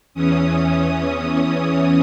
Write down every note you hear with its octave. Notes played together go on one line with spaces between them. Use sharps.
E2 E3 C#4 D#6